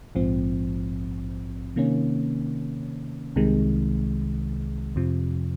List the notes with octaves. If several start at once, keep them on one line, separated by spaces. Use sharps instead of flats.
A#1 G#2 F3 C4
C3 D#3 A#3 C#4
C2 C3 D#3 G#3
F2 C3 F3